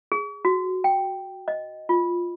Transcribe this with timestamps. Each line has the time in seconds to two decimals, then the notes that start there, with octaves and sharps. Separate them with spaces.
0.12 G#4
0.45 F#4
0.84 G5
1.48 D#5
1.89 F4